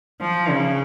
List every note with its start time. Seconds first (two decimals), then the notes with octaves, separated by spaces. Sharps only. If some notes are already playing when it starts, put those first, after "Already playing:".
0.20 F3
0.50 C#3